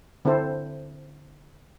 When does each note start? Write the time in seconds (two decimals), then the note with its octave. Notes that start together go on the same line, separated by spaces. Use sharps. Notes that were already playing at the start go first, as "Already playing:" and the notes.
0.25 D3 C4 E4 A4 C5